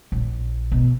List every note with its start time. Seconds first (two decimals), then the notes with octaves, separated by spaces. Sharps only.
0.12 A#1
0.72 B2